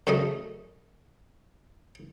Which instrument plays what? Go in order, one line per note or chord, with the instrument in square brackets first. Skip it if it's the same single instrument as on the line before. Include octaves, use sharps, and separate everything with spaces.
[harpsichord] F#2 C#3 A3 D#5